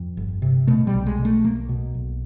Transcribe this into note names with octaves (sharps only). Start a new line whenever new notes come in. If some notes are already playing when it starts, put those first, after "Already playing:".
Already playing: F2
G1
C3
B2 A3
G3
B1
G#3
B2
A3
B1 A#3
B2
B1